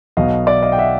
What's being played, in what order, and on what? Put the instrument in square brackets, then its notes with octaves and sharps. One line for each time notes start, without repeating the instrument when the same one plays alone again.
[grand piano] B1 B2 D#5 F5
D5 E5
D#5 F5
G5
E5 F#5